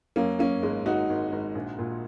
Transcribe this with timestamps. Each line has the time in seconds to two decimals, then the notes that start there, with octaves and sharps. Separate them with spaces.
0.16 F#2 A#3 C#4
0.39 F#2 A#3 C#4
0.62 G#1 G#3
0.85 G#1 D#4 F#4
1.10 G#1
1.32 G#1
1.55 A#1
1.78 A#2